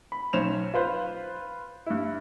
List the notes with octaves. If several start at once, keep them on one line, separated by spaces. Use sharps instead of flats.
B5
B1 C#4 C5 E7 F7
F4 B4 C5 B5
G2 E4